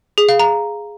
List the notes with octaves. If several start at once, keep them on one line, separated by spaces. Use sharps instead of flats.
G#4
F5
A#5